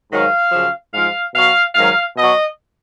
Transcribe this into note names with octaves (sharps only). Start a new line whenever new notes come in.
G#2 D#3 F#3 F5
F#2 C#3 F3
G#2 F3 F5
B2 F#3 F5
G#2 D#3 F#3 F5
B2 F#3 D#5